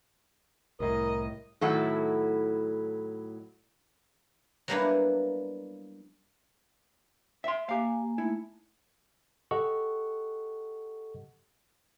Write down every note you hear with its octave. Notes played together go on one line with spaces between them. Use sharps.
C2 A2 A#4 D#5
A2 D#3 F#3 E4 A4 F#5
F#3 G3 A#3 B3 D4 E4
E5 C6
A#3 G4 F5 G#5
A3 A#3 D#4 E4
G4 A4 D#5 F#5 C#6